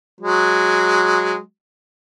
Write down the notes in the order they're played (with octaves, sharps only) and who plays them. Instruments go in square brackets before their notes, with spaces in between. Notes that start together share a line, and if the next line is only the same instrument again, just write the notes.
[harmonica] F#3 G#3